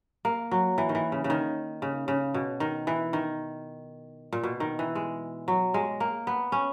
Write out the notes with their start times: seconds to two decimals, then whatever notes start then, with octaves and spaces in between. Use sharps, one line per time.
0.25 A#3
0.51 F#3
0.78 E3
0.89 D#3
0.95 E3
1.12 C#3
1.24 C#3
1.30 D#3
1.82 C#3
2.08 C#3
2.34 B2
2.60 D#3
2.87 E3
3.13 D#3
4.33 A#2
4.43 B2
4.60 D#3
4.79 E3
4.95 G#3
5.48 F#3
5.74 G#3
6.00 A#3
6.27 B3
6.52 C#4